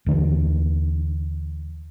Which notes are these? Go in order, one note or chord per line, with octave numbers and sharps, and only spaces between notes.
D#2 D3 E3